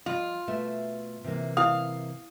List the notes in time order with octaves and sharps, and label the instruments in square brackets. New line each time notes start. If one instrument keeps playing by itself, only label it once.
[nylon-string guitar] F3 D#5 [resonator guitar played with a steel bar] F4
[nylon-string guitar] B2 A3 E5
C3 E3 A#3
[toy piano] E4 D#6 [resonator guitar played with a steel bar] F5